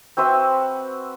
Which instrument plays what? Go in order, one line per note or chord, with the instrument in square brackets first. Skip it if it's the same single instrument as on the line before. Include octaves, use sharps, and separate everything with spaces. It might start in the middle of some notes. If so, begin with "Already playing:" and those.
[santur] C4 F#4 B4 E5